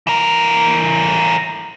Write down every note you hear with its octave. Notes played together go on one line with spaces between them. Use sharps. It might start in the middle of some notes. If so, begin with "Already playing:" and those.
E3 A#4